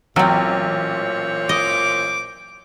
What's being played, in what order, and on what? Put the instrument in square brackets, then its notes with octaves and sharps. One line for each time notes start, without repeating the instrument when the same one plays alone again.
[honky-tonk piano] A1 [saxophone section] A#2 C5 C#5 [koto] F#3 C4
[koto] D#5 [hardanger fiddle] D6